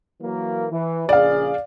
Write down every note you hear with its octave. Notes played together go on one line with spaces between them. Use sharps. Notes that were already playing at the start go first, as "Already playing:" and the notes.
E3 F#3 A#3
E3
A#1 C#3 G#4 D5 F5